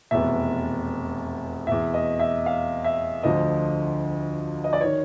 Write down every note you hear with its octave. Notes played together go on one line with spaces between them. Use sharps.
F1 E2 B2 E5
E2 B2 E5
D#5
E5
F5
E5
D2 D3 F3 D#5
D#5
D5
D#3 C#5